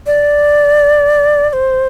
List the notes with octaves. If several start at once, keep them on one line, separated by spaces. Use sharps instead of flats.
D5
D5
C5